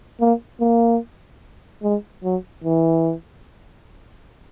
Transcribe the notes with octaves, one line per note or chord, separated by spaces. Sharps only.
A#3
A#3
G#3
F#3
E3